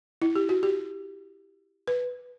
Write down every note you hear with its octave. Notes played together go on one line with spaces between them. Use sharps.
E4
G4
F#4
G4
B4